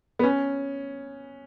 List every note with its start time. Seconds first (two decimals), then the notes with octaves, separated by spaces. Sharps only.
0.19 B3
0.24 C#4